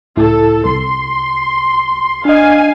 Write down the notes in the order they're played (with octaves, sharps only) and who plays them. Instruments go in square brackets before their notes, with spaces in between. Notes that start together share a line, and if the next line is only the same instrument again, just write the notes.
[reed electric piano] C#2 A2 E4 [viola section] A4
[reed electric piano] C2 [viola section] C6
[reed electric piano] D4 D#5 [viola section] F5 G#5